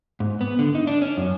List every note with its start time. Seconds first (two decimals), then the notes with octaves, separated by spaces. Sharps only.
0.20 G#2
0.41 B3
0.59 D3
0.75 D#4
0.87 D4
1.02 C#4
1.17 F#2